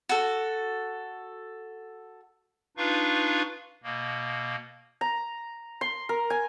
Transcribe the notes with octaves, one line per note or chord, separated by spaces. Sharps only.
F#4 A4
D4 D#4 F4 B4 F5 C#6
B2 A#3
A#5
C6
A#4
G#5